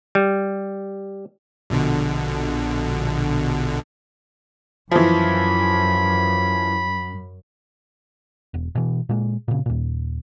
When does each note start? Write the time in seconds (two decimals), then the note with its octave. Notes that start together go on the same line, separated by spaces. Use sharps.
0.15 G3
1.70 A#1 B2 D3
4.91 F#2 E3 F3 B5
8.54 E1
8.75 B2 E3
9.09 A#2 G#3
9.48 A#2 C#3
9.66 D#2 A#2